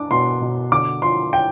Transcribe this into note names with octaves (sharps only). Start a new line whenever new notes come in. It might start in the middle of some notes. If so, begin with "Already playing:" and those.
Already playing: D4 D6
B2 C6
B2
D3 D6
F3 C6
G5